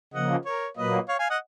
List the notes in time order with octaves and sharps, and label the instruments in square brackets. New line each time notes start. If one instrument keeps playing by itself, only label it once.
[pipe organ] C#3 F3 A#3 [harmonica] D#5 F#5
[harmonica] A#4 C#5
[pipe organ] A#2 F#3 A#3 [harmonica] B4 D#5
[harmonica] C#5 F5
F5 G#5
D#5 F#5